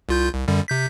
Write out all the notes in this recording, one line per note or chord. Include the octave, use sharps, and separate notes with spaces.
C2 F4 G6
C2
F#2 D3 G3
C3 G6 B6